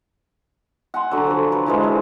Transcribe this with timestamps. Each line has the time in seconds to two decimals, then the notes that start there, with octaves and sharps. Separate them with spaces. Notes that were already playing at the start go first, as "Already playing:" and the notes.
0.94 F#5 G#5 C6
1.11 D3 F#3
1.27 F3 F#3
1.52 B4
1.66 E3 F3 G#3
1.83 E5